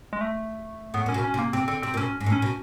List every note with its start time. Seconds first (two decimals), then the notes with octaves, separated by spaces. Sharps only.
0.13 G#3
0.21 A3
0.94 A2 B3
1.06 A#2 C#4
1.14 B2
1.24 C#4
1.34 C3
1.39 A#3
1.53 C3 C4
1.68 D3 C4
1.82 C3 C4
1.94 A#2
1.97 B2 C#4
2.21 G#2
2.26 A2
2.32 C#4
2.42 B2